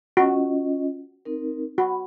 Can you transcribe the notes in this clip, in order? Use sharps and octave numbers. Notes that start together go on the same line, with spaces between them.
C#4 F4 F#4 D#5
C4 D#4 A#4
F#4 B5